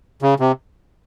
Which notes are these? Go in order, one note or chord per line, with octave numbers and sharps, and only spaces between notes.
C#3
C3